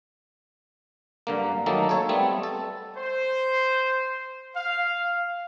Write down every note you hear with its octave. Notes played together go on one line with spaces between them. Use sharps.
G2 D3 A#3
D#3 F#3 A3 A#3 D#4 A4
A4 C#5
G3 A3 B3 C4
A4
C5
F5